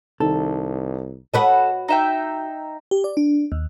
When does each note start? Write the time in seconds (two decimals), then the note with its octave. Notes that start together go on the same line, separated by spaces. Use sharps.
0.20 C2 D#3 A4
1.34 F#4 A4 B4 D#5
1.88 D#4 E5 G5
2.91 G4
3.04 D5
3.17 D4
3.52 D#2